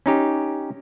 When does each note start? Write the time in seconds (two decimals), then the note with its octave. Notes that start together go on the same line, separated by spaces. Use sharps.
0.06 C#4 D#4 G4